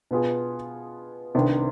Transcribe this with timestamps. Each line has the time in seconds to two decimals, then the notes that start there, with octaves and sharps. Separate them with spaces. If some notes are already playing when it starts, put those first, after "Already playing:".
0.11 B2 B3 F4 G#4
1.35 C2 C3 D#3 B3 D4